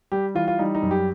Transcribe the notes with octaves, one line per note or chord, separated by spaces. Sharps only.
G3 G4
E3 F4
F4
G3 D#4
D#4
F#2
G4